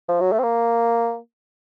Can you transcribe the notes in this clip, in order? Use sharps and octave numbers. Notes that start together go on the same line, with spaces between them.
F3
F#3
A3
C4
A#3